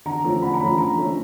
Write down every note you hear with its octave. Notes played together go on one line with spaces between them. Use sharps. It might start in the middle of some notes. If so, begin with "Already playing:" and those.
D3 A#5
F3 A3 C#4
D3 B5
A#5
F3 A3 C#4 B5
D3 A#5
F3 A3 C#4